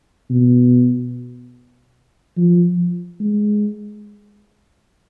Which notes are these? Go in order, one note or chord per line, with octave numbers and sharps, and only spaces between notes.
B2
F3
G#3